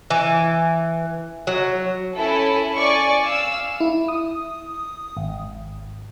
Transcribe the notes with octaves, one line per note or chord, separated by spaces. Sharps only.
E3
F#3
C#4 E4 A4
D5 G#5 C#6
F5 E6
E4
D#6
G#1